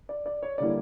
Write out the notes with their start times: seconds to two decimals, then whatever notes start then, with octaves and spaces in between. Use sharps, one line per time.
0.09 D5
0.26 D5
0.43 C#5
0.58 D3 G3 A#3 E4 D5